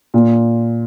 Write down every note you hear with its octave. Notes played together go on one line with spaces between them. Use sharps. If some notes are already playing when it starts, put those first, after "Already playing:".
A#2